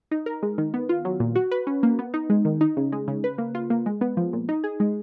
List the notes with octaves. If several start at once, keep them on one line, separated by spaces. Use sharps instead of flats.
D#4
A#4
G#3
D#3
B3
F4
F#3
A#2
F#4
B4
C#4
A#3
B3
D#4
G#3
D#3
D#4
C#3
G#3
C#3
B4
A#3
F4
A#3
G#3
B3
F3
A#2
D#4
G#4
G#3